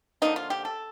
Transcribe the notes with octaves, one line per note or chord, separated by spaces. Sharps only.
D3 F3 A#3 D#4
F4
G4
A4